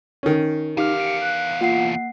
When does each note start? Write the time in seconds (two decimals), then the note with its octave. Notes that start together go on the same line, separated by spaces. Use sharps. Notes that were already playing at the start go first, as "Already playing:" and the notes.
0.23 D#3 C#4
0.77 E2 D#4 G4 F5 D6 F6
1.00 C#7 D7
1.21 F#6
1.61 A#3 F4 F#5 C7